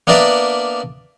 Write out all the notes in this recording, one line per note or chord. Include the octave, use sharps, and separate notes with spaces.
A#3 B3 D4 A#4 D5 E5